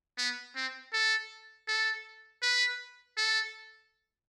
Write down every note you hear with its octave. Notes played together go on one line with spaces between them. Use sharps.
B3
C4
A4
A4
B4
A4